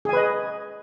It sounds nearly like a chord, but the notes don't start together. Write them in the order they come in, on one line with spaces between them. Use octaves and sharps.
G#4 G#5 B4 D#5